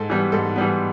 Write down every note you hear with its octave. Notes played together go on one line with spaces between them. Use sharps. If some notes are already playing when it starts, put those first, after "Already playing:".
Already playing: G#2 A4
E3 G3 B3
G#2 A4
E3 G3 B3